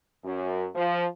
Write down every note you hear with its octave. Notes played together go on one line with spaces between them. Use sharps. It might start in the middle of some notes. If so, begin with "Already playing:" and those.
F#2
F3